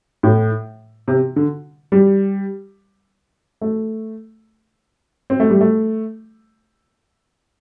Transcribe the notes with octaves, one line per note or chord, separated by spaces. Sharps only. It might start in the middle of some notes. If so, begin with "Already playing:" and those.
A2
C3
D3
G3
A3
C4
A3
G3
A3